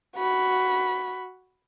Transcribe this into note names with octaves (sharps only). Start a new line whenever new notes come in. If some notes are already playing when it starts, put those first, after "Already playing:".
F#4 B5